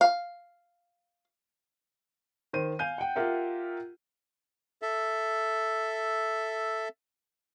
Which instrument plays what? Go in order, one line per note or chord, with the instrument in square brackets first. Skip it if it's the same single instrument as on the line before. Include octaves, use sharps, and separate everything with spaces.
[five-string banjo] F5
[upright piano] D#3 C5 D#7
F5 G#5 G6 D#7
F#5 G5
F4 G4 A#4 E5 F#5
[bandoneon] A4 E5